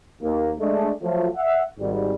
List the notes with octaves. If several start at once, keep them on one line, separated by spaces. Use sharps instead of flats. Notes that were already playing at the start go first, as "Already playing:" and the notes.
D#2 A#3
G#3 A3 D4
F3 F#3 A3
E5 F#5
G#1 G#2 G3